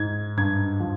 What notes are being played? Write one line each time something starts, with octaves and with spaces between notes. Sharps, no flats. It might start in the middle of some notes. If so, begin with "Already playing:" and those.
Already playing: G#2 G#6
G2 G#6
F3